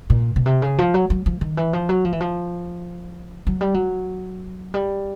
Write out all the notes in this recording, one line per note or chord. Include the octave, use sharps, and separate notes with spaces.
A#2
B2
C3
C#3
F3
F#3
F#3
F3
D#3
E3
F3
F#3
F3
E3
F3
F#3
G3
F#3
G3